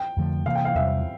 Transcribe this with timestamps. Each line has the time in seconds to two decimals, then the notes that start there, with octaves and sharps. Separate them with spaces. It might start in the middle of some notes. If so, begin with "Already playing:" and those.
Already playing: G5
0.17 F2 D3 F3 A3
0.46 C3 E3 A#3 F5
0.55 G5
0.65 F5
0.75 E2 C3 G3 E5